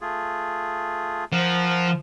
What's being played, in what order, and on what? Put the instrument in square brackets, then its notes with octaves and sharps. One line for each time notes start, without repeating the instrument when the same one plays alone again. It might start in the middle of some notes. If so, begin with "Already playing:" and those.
[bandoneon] A3 F4 G#4
[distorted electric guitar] F3 [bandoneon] A#4 F#5